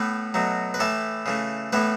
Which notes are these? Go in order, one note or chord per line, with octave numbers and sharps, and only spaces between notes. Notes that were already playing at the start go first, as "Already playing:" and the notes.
Already playing: A2 A3 B3 B4
B2 F#3 A3
B4
A2 E3 A3 A4
C#3 E3 A3
A2 E3 A3 B3 B4